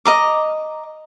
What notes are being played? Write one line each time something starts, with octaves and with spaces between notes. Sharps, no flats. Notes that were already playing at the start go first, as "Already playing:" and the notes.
D#5 A#5 D6